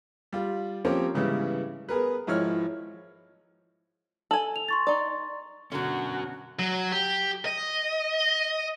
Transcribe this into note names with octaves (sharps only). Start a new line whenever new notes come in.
G3 F4
F3 A#3 C4 C#4 G4 A#4
G#2 C#3 E3 G3 B3
B3 G#4 A#4 B4
G#1 F3 E4 C#5 F6
A4 G#5 F#7
F7
C6 C#6 A6
D#4 D5
B2 D3 C#4 F#4 A#4
F#3
G4
D#5